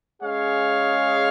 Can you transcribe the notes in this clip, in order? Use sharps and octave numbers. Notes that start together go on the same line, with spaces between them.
G#3 C#4 G#4 C#5 F5